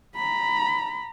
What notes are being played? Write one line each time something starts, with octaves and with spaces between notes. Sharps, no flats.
A#5 B5